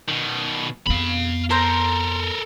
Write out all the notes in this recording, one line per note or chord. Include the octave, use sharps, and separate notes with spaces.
B2 D#3
F2 B3 F5 B5
A4 A#4 C5 A#5